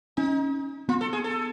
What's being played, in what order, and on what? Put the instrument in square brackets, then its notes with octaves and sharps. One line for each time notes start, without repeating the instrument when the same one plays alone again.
[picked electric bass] C#4 [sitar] D#4
[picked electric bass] B3 [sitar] F4
[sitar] A4
G#4
A4